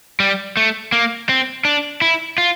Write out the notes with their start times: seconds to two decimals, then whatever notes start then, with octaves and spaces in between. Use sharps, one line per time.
0.20 G3
0.57 A3
0.92 A#3
1.29 C4
1.65 D4
2.02 E4
2.38 F4